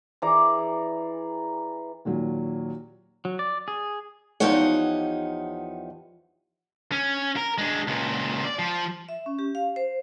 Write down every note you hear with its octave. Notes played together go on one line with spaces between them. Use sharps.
E3 G#4 D5 A#5
D#2 A#2 F#3
F#3
D5
G#4
E2 F3 D#4 G4 C#5 F#5
C#4
A#4
G#3 D4
C#2 A#2
D5
F3
E5
C#4
G4
F5
C5